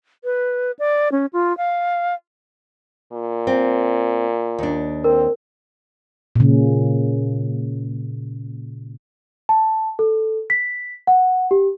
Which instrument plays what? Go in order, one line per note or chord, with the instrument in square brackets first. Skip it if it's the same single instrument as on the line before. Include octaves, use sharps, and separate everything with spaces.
[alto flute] B4
D5
C#4
F4
F5
[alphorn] A#2
[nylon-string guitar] C4
D#2 D4
[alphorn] C4 [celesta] A#4
[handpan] A#2 C#3
[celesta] A5
A4
B6
F#5
G4